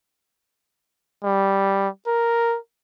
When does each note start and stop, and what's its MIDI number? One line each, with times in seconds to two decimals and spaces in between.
1.24 1.88 55
2.07 2.57 70